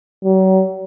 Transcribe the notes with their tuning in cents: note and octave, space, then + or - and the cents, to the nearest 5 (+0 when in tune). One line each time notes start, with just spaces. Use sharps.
F#3 +40